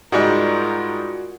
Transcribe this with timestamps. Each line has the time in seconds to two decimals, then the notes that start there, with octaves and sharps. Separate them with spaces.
0.12 G#2 G3 G#3 F4 F#4 G#4 A#4 D5